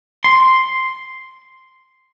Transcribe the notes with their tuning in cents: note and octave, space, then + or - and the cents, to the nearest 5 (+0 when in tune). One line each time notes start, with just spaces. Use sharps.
C6 +0